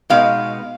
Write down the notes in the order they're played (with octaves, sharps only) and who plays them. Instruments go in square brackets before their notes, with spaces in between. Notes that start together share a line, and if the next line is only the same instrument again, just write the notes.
[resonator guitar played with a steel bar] B2 G#3 B3 D#4 F5